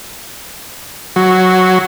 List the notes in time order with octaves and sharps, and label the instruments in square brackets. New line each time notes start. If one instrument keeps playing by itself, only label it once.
[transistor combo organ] F#3